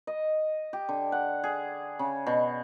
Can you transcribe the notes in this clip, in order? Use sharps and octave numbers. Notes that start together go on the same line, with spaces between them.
D#5
G4
D3
F#5
G#4
C#3
B2